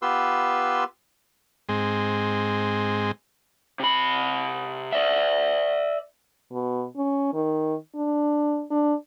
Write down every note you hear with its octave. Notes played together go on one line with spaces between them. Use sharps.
B3 F4 G4 B4 C6 E6
G#2 G#3 C4
C3 B5
D5 E5
B2
C#4
D#3
D4
D4